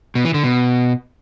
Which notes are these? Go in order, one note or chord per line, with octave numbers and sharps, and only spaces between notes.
B2
E3
D3
B2